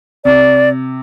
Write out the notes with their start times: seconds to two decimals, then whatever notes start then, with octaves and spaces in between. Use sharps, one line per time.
0.25 C3 D5